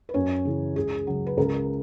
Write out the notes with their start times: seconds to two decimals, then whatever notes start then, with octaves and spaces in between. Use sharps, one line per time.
0.09 B4
0.14 F#2 C#4 C#5
0.45 C#3 E3
0.76 C#2 G#4
1.07 C#3 F#3
1.26 B4
1.37 C#2 A#4